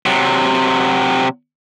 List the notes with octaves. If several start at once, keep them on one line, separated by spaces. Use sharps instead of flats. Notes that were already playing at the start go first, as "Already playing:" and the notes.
C3 F#3